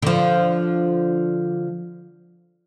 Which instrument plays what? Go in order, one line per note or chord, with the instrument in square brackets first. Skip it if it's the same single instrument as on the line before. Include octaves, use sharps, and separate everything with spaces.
[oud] D3 F3